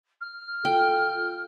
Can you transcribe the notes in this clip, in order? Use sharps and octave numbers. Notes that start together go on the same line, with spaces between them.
F6
F4 A4 G5